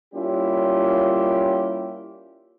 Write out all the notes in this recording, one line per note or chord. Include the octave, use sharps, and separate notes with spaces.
G3 A#3 C#4 E4 F4 G4